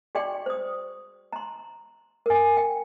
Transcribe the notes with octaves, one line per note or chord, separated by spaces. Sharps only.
F#4 G#4 D5 G5 C6 C#6
C5 D#6
A#5 C6
A#4 G#5
G5